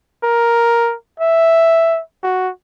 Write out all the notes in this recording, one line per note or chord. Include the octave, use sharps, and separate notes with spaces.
A#4
E5
F#4